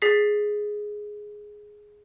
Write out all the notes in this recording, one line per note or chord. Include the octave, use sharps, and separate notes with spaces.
G#4 A6 B6 C7